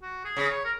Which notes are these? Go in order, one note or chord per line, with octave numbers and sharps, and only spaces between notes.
F#4
G#4
C#3
C#5
A#4